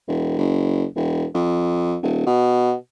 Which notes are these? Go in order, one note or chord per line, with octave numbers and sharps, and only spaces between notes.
E1
F#1
E1
F2
D#1
B2